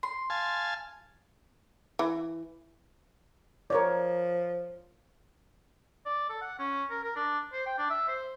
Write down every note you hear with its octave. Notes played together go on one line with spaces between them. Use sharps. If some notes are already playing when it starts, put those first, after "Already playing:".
C6
F5 G#5 A5
E3
F3 A#4 C#5 D5
D5
A4
F#5
C#4
A#4
A#4
D4
C5
G5
D4
E5
C5